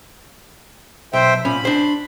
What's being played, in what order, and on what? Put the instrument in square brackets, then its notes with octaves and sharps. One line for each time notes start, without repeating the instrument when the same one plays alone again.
[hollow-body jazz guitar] B1 [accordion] C5 E5 G5
[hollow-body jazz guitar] A#2 C#4 [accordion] B5
[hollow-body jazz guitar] D4 C5